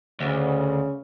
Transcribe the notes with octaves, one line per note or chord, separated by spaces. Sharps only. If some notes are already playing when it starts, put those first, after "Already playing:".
D2 C#3